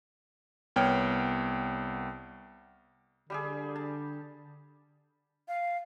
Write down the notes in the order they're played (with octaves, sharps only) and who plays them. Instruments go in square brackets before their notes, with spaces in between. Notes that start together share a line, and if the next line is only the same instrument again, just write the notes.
[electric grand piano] C2 B3 C#5 G5 F6
[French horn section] D3 [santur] G3 G4 G#4
[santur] A5
[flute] F5